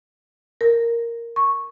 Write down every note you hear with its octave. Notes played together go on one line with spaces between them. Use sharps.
A#4
C#6